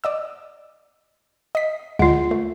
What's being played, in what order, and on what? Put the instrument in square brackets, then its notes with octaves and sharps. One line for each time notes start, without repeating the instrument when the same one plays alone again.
[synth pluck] D5 D#5 E6
D#5 B6
[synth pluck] D2 G#3 [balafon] F4 F#5
[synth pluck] A3